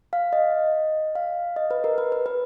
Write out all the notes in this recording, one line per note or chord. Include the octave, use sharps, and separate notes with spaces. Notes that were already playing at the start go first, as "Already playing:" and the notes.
F5
D#5
F5
D#5
B4
A#4
B4
B4
B4